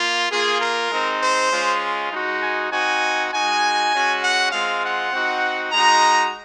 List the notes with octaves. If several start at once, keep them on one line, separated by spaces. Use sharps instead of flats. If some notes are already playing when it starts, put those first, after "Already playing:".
Already playing: A#3 F4
A#3 F4 G#4
A#4
G#3 C4 D#4
C5
G#3 C#4 F4
G#3 D#4 F#4
G#5
C4 D#4 F#4 G#5
G#3 D#4 F#4 G#5
G#3 C#4 F#4
F#5
G#3 C4 F4 F5
F#5
C4 D#4 F#4
G#3 D#4 F#4 A#5